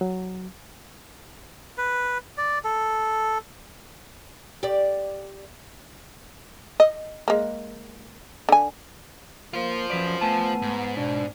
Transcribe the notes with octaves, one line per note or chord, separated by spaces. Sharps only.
F#3
B4
D5
A4
G4 D5
D#5
G#3 A#3
D3 G#5
A#3 F4 C5
F#2 F3 B4 D5
A3 B3 G#5 A5
G#2
B2 D4